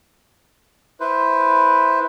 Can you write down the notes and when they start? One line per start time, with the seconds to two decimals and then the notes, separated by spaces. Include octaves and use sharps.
1.00 E4 B4 C5